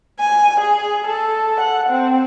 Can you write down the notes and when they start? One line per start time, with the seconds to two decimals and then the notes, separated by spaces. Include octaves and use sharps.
0.20 G#5
0.60 G#4
1.07 A4
1.61 F#5
1.89 C4